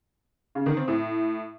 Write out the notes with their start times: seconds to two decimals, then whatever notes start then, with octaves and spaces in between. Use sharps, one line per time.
0.55 C#3
0.66 D#3
0.77 C4
0.88 A2